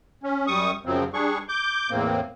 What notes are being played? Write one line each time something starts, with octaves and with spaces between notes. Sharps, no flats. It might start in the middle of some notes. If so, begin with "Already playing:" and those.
C#4
F#2 G3 C#6 D#6
F#2 C#3 F3 F#3 C4
G3 D4 G#4 C#6
D6 G6
E2 A2 A#3 C4